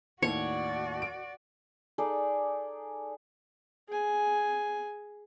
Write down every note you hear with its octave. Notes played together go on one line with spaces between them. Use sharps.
D#2 A2 F#4 C#5 D5
D7
D#4 G#4 A4 D5
G#4 G#5